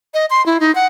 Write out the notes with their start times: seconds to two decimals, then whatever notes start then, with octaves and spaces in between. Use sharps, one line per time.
0.14 D#5
0.30 C6
0.46 E4
0.60 D#4
0.75 F#5